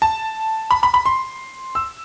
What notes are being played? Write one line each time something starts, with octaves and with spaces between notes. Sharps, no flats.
A5
B5
B5
B5
C6
E6